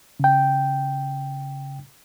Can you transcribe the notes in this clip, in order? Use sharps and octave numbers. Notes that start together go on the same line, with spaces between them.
C#3 G5